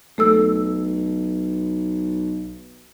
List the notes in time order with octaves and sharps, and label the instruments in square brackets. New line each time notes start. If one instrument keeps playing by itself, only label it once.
[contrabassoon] B1 [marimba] A3 A4 E6